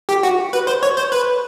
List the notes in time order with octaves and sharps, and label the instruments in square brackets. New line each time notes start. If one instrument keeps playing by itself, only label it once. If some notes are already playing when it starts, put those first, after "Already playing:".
[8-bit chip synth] G4
F#4
B4
C5
C#5
C5
B4